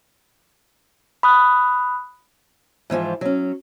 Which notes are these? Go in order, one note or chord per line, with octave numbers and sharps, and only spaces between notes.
B5 D#6 F#6
G#2 E3 F3 F4
F#3 C#4